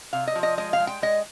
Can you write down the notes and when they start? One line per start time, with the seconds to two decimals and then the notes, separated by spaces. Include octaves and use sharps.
0.13 C3 F5
0.27 D#5
0.35 F3
0.43 D#5
0.58 G#3 D#5
0.73 F5
0.80 G#3
0.87 G5
1.02 G#3 D#5